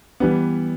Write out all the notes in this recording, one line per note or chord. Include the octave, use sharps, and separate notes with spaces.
E3 G3 B3